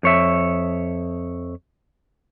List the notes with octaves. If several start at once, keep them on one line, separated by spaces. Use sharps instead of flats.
F2 C#5 E5